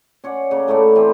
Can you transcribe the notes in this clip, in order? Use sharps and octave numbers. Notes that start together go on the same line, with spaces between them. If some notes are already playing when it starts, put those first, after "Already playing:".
C#4 C#5 D5 F#5
C#3 A#3
A2 A3 E4 D5
E3 C4